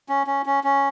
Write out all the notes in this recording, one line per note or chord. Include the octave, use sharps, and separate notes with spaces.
C#4
C#4
C#4
C#4